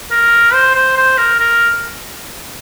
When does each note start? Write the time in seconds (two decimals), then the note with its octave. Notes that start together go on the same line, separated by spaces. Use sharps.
0.11 A#4
0.53 C5
0.75 C5
0.97 C5
1.17 A#4
1.40 A#4